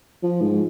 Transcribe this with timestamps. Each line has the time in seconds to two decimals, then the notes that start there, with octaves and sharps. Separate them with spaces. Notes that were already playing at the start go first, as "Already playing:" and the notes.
0.23 F3
0.42 G#2